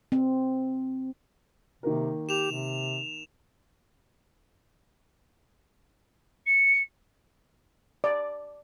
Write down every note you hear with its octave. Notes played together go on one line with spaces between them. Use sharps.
C4
C3 D#3 A#3 A#4
G4 E7 F7
C3
C#7
D5